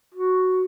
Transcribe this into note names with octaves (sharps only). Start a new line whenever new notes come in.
F#4